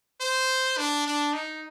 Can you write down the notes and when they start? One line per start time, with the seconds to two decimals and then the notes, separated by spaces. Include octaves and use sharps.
0.21 C5
0.77 D4
1.06 D4
1.33 D#4